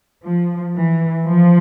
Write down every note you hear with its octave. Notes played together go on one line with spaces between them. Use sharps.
F3
E3
F3